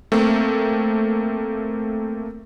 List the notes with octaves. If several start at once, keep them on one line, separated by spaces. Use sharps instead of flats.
A3 A#3 C4